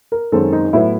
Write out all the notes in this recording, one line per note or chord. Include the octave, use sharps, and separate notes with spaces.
A#4
F#2 D#3 G#3 C4 A4
D#4
A2 F#3 B3 E4